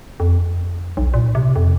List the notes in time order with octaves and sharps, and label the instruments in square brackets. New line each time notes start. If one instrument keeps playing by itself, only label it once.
[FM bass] F2
B1
A#2
C3
F2